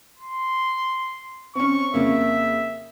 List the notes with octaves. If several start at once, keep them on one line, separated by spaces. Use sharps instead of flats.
C6
C4 C#4 C#6
F2 C#3 A#3 E5